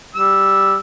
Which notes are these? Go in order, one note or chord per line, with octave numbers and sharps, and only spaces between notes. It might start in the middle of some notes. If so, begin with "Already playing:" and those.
G3 E6